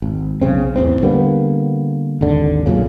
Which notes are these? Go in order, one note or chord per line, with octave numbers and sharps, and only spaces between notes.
G#1
B1 C#3 C4
A1 E2 G#2 C4
D3 G3 A#3 B3
G#1 D#2 D3
B1 F#2 A#2 C#3